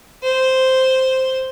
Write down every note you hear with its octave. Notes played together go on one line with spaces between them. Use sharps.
C5